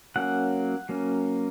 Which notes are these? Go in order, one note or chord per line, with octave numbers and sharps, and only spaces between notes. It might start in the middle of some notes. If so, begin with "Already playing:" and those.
F#3 A#3 C#4 F#5
F#3 A#3 C#4